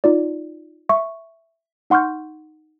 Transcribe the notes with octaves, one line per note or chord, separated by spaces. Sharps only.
D#4 F4 D5
E5 C#6
D#4 F#5 C6 C#6 F6 G6